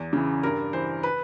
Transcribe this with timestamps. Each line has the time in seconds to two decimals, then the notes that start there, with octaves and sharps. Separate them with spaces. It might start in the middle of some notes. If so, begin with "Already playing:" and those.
Already playing: E2
0.13 C#3 E3
0.43 G2 A#4
0.73 E3 C5
1.03 B4